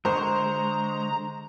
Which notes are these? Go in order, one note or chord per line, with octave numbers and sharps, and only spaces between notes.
D3 G#3 C5 A#5 C#6